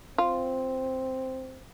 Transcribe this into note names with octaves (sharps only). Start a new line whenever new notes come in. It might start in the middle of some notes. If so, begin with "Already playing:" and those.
C4 F4